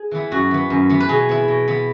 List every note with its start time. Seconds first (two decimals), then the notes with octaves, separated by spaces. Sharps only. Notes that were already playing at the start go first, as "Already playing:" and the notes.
Already playing: G#4
0.11 E3 B3 E4
0.31 F#2 F#4
0.51 E3 B3
0.70 F#2
0.89 E3 B3
1.00 B4
1.09 B2 G#4
1.29 B3 E4
1.48 B2
1.68 B3 E4